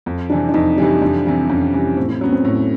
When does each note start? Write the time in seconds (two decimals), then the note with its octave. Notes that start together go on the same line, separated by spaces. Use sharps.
0.06 F2
0.30 C3 E3 G3 D4
0.49 D4
0.54 F2 D#4
0.78 C3 E3 G3 D4
1.01 F2 D4
1.25 C3 E3 G3
1.49 F2 C#4
1.74 C3 E3 G3
1.97 A2 C4
2.09 C4
2.21 F#3 B3 C#4
2.32 C4
2.45 A2